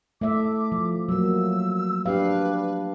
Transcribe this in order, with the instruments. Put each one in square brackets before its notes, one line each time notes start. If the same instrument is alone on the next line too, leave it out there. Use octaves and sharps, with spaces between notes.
[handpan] A3 E5 [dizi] D6
[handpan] F3
[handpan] F#3 A#3 [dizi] E6
[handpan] D4 G4 F5 [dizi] B4